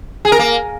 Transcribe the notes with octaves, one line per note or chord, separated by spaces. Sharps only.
G#4
A#4
A#3